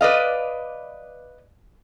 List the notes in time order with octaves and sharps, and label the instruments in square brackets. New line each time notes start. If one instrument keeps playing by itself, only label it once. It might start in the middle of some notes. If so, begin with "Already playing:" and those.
[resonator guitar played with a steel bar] B4 D5 D#5 F5